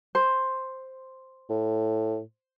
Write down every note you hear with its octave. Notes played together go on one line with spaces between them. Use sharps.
C5
A2